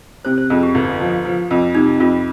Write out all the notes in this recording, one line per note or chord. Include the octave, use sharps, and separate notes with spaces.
C3 C5
C5
F2 G#4
G4
G1
F3
F3
F2
C3 D#4
F2 F4